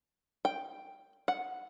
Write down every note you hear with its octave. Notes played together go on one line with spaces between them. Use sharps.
G5
F#5